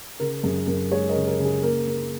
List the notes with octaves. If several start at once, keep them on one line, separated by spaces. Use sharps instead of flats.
C#3 A#4
F#2 G#4
F#2 A#4
G#3 G#4 C#5
A#4 D#5
C#3
A#4
C#3
G#4
A#3 A#4
A#3